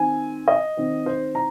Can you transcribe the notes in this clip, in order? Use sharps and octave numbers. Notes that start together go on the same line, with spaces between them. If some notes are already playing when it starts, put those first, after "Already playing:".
Already playing: D#3 C4 G#5
D#5
D#3 C4
C5
A#5